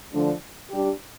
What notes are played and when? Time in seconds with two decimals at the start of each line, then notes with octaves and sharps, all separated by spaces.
0.13 D3 F3 A3 D4
0.71 G3 D4 G4